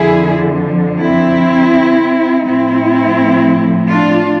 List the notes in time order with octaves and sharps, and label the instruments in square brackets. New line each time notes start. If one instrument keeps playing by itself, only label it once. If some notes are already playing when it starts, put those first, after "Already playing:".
Already playing: [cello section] F2 D3 F3 E4 G#4
C4 E4
A2 F3 C4 E4
D4 F4